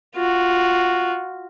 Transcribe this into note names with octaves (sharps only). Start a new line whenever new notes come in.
F4 F#4